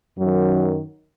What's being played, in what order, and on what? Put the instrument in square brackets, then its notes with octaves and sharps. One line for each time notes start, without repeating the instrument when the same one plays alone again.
[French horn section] F#2 D#3 F#3